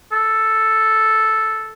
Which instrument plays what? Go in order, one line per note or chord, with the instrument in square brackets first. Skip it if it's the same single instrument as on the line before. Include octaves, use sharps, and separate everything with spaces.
[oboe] A4